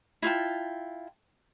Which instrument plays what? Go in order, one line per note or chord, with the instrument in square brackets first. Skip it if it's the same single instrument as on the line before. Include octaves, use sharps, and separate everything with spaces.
[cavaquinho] E4 F4 G5 A5